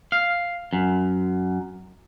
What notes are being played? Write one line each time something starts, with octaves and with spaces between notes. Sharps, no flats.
F5
F#2